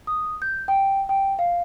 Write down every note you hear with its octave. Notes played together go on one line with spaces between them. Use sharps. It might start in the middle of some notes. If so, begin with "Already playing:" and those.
D#6
G6
G5
G5
F5